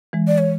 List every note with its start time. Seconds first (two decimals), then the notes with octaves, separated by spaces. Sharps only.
0.13 E3 G#3
0.28 D5
0.38 C#5